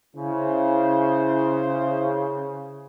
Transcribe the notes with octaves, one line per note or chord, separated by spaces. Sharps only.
C#3 E4 C5